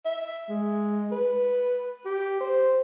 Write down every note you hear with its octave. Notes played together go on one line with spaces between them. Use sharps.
E5
G#3
B4
G4
C5